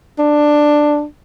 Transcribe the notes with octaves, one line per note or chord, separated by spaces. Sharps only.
D4